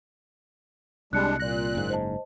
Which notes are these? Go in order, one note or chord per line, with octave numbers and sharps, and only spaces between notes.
C2 G3 G#3 D4 F#6 C#7
A#2 D5 F#6 A#6
F#1 G#2
C5 D#5 A5